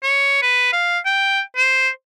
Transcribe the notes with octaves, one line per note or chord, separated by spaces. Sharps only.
C#5
B4
F5
G5
C5